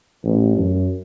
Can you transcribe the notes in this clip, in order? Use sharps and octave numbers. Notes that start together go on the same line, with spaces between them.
A1
F#2